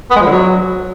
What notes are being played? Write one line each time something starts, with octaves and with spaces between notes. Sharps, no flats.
B3
G#3
F3
D3
F#3